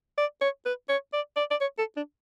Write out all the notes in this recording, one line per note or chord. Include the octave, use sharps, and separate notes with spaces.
D5
C#5
B4
C#5
D5
D5
D5
C#5
A4
D4